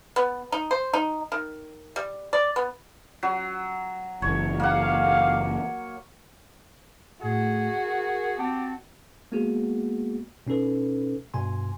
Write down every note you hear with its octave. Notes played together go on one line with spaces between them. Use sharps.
B3
D#4
C5
D#4
D#3
G3
D5
B3
F#3
F#1 E3 C#5
A#3 G4 A4 F5 F#5
A2 F#4 G#4
A#4
C4 G4 A5
G#3 A#3 B3 F#4 G#4
B2 C#4 D#4 A4 B4
G2 B2 G#5 C6